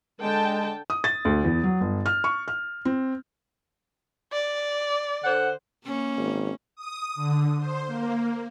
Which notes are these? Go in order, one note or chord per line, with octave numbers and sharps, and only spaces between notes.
D3 G#3 G5 A5
D#6
A6
D2
E2
F#3
G1
F6
C#6
F6
C4
D5
D3 C5 F#5
A#3 C#4
G#1
D#6
D3
C5
A#3